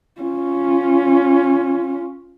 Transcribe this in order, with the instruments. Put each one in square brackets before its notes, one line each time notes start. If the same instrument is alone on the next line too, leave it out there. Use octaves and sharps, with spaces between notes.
[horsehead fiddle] C#4 F4